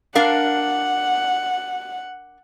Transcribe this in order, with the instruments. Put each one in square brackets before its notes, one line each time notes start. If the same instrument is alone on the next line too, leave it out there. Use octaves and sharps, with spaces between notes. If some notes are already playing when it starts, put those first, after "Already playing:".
[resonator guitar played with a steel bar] D4 A#4 F5 [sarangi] F#5